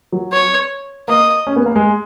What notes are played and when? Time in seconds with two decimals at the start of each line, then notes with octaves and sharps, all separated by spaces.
0.12 F#3
0.32 C#5
1.08 A#3 D#5
1.47 C#4
1.56 B3
1.66 A#3
1.76 G#3